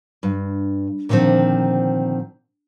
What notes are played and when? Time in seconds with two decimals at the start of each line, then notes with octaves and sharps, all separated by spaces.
0.23 G2
1.09 A#2 D3 D#3 F3 C4